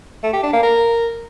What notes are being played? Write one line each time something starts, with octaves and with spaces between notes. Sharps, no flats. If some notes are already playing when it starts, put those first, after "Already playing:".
A3
G4
D4
A#3
A#4